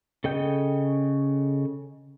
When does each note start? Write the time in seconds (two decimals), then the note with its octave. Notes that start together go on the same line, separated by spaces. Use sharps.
0.24 C#3 A4 D#5 G5 G6